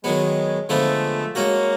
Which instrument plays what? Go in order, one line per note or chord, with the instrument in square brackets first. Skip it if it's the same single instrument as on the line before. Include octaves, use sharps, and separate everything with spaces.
[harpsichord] D#3 F#3 B3 [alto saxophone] G#3
[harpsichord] D3 F3 G#3 B3 [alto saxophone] A3
[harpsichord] G#3 C#4 F#4 [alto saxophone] A#3